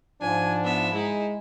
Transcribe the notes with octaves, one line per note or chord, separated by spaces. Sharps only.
G#2 F3 D4 G#5
B3 E5
G#3 D#4 E4